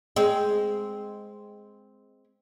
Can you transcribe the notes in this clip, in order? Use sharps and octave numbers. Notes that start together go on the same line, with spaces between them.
G#3 C4